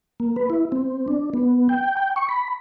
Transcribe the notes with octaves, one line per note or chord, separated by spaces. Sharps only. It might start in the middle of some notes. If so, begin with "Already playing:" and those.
A#3
B4
E4
C4
D4
B3
G5
G5
C#6
B5